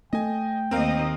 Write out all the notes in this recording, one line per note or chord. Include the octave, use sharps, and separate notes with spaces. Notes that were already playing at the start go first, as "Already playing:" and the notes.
A3 D#5 G5 G#5
D#2 C4 A#4 D#5 F5